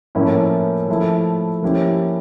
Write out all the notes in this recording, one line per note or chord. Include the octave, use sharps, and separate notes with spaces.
A2 F3 A#3 C#4 E4
F3 A3 E4
F3 A#3 C#4 E4 G4